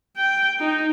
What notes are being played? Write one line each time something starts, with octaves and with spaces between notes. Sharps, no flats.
G5
D#4